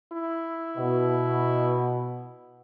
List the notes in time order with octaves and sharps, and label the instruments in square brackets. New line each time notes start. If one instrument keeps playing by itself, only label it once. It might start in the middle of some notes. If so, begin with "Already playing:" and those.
[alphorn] E4
[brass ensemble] B2